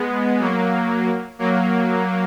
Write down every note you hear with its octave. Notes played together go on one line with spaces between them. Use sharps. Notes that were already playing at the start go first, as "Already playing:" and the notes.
Already playing: G#3 B3
F#3 A#3
F#3 A#3